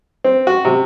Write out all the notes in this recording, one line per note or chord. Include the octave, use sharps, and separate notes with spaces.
C4
F#4
C3